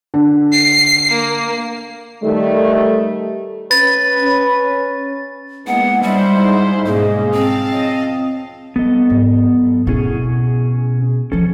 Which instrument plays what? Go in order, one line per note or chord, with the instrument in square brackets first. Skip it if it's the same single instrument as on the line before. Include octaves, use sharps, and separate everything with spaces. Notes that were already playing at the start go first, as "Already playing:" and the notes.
[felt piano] D3
[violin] C7
A#3
[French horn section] D#3 G3 A3
[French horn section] C#4 [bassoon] B4 [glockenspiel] A6
[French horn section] C#4
[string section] E3 G#3 A#3 [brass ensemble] B3 D#4 G#4 [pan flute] F#5
[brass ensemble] G#2 B2 D4 [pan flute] G3 [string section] G#3 E4 C5
[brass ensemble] G#2 D#4 F4
[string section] B1 G#2 C#3 [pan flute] A#3 [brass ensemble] G#4 D#5
[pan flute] C4 [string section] F5 A5
[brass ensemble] F3 C#5 D#5
[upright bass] G3 [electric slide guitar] B3 A4 D#5
[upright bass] G#2 F#3
[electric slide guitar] B2 C#4 G#4 [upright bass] E4
[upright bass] E3 F3 [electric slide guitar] C#4 A4